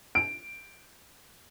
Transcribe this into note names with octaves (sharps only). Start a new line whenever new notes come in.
D7